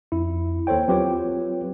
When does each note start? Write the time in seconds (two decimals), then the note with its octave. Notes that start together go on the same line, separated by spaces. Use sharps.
0.12 F2 E4
0.67 D#2 A4 C5 C#5 G5
0.88 F#3 C4 F4 G4 B4 C#5